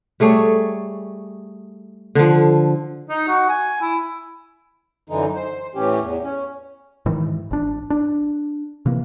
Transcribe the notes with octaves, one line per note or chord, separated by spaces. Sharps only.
G3 A3 G#4 C#5
D3 F3
D#4
F#4
G#5
E4
F#2 D3 E3 D#4
C5
A2 E3 C#4 G4
E2
C#4
G#2 D#3 E3
G#1 D4
D4
C3 E3 A#3